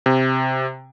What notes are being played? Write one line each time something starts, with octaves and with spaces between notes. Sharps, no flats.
C3